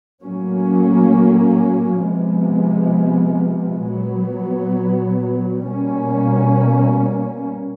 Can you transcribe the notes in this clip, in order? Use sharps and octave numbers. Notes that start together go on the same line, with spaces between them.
A2 F#3 A#3 C#4
C3 F3 G#3 B3
A#2 F#3 B3
B2 G3 A#3 C#4